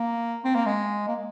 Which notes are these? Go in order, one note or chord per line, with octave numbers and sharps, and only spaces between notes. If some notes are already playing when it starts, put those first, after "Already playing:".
Already playing: A#3
C4
A#3
G#3
A#3